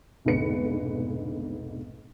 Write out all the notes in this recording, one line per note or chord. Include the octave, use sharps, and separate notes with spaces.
F1 B1 G#2 D3 B4 C#7